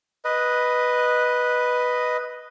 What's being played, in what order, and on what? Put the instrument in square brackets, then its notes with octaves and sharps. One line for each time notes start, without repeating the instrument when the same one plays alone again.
[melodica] B4 D#5